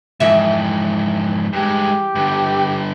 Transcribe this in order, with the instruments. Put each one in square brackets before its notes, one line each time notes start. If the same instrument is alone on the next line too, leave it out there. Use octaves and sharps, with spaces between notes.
[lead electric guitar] F2 G#2 [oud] E3 E5
[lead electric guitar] G2 G#3 [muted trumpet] G4
[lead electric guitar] G2 D3